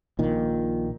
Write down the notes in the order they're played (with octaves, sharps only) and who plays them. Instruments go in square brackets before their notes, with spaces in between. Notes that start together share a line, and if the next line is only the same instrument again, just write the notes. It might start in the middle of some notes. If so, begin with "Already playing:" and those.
[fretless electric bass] A#1 A#2 D#3